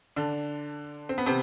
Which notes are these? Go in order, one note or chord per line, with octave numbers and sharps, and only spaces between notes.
D3 D4
C4
B3
C3 C4